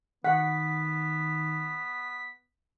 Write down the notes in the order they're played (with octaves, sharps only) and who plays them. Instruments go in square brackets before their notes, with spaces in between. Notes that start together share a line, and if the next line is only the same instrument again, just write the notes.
[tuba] D#3 [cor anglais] B3 [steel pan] F#5 [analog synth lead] B6